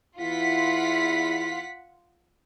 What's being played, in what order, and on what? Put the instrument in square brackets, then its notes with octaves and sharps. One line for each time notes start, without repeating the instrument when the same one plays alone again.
[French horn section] E2 E4 [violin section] F4 F#5 B6